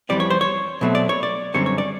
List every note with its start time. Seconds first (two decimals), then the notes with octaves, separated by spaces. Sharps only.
0.09 F2 C3 E3 G3 C4 D5
0.20 C#5
0.30 C5
0.41 C#5
0.81 B2 F#3 A3 C4
0.95 D5
1.09 C#5
1.23 D5
1.54 F#2 D3 G3 C4 C#5
1.66 C#5
1.78 D5